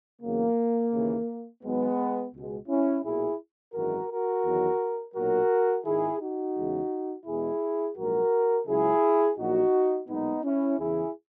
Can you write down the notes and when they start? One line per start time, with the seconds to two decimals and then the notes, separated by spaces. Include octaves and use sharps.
0.22 E2 C#3 F#3 A#3
0.93 D#2 C#3 E3
1.63 G#1 G#2 F#3 G#3 B3
2.33 C#2 B2 G#3
2.68 C#4 E4
3.04 B1 A#2 F#3 E4 G#4
3.74 G#1 F#2 E3 G#3 F#4 A#4
4.09 F#4 A#4
4.44 E2 D#3 F#3
5.15 B1 A#2 F#3 F#4 A#4
5.85 G#1 G#2 D#3 E4 G#4
6.20 D#4 F#4
6.56 E2 C#3 E3 G#3
7.26 E2 B2 G#3 E4 G#4
7.96 A#1 G#2 F#3 F#4 A#4
8.67 C#2 C#3 F#3 E4 G#4
9.37 A#1 A#2 F#3 D#4 F#4
10.08 B1 A#2 G#3 B3 D#4
10.43 C#4 E4
10.79 E2 C#3 E3 E4 G#4